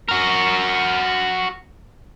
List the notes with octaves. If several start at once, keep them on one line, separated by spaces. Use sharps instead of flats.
F#4 A#4